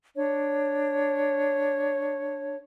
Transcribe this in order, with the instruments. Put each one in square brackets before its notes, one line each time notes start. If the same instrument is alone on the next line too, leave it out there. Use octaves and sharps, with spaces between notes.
[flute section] D4 C#5